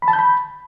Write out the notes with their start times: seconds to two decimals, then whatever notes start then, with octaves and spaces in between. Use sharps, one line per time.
0.02 B5
0.08 A5
0.13 G6
0.19 B5